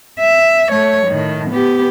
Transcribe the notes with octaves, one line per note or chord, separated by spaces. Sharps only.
E5
A3 C#5
A2 D#3
B3 G4